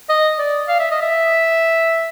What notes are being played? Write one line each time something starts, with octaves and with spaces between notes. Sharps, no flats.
D#5
D5
F5
E5
D#5
E5